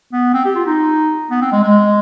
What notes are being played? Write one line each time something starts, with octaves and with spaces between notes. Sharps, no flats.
B3
C4
G4
F4
D#4
B3
C4
G#3
G#3